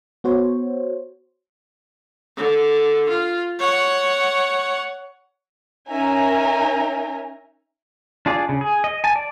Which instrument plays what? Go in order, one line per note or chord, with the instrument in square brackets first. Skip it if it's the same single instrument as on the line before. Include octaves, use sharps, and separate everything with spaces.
[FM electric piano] B3 F#4 C5 C#5
[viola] D3
F4
C#5 F#5
[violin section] C#4 D#4 A#4 E5 G#5 A#5
[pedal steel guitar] D4 F4 G#4 D5
C#3
G#4
D#5
G#5 A5
D5